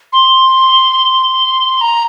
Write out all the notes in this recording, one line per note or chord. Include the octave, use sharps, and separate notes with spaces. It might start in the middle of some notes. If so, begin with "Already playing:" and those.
C6
A#5